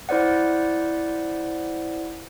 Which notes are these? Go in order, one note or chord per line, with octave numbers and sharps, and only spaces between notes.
E4 C5 D5 F#5